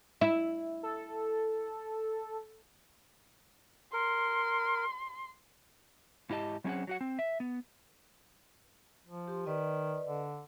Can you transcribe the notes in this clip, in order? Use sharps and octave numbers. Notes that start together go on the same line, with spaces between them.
E4
A4
A#4 C6
G#2 E4 G4 D#5 A5
F#3 C4 C#4 G#4 C5 F#5
F#3 F#4 F#5
C4
E5
B3
F3
G4 C6
D#3 B4 D5 D#5
D3